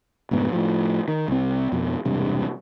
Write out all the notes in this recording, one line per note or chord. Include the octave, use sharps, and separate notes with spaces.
F1 D2 G#2 B3
A2 F3
D#3
C2 C4
F2 B2
E1 G2 C3